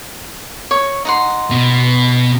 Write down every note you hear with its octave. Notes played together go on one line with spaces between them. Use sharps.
C#5 C#6
D#4 F#5 C6
B2